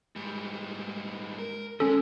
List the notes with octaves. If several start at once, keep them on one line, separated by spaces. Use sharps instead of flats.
G#2 G3
A#4
G#2 G#3 C#4 A4